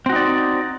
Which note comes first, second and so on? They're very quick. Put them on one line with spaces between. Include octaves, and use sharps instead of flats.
C4 F#4 D#4 D5